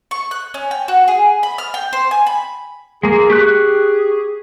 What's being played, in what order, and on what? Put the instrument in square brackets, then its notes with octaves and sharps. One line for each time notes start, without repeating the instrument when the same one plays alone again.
[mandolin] C#6
F#6
C#4
G5
F#4
G#4
B5
F6
G5
C5
G#5
B5
[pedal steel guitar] G#3 A#3 [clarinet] G#4
[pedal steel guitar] G4 C#6 F#6